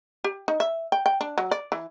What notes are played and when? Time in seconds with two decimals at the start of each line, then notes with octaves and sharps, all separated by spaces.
0.24 G4
0.48 D#4
0.60 E5
0.92 G5
1.06 G5
1.21 D4
1.38 F#3
1.51 D5
1.72 E3